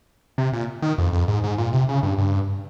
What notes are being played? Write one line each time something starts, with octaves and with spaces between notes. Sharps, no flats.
C3
A#2
D#3
F2
F2
G#2
G#2
A#2
C3
C#3
G2
G2